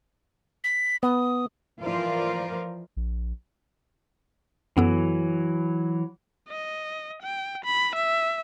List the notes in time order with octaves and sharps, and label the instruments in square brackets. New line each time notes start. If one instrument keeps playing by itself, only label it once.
[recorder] B6
[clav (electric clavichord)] B3 [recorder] D#6
[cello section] E3 F3 F4 A#4 C5 D5
[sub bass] A#1
[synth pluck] F#2 B3 A4 [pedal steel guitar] E3 F#3
[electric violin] D#5
G5
B5
E5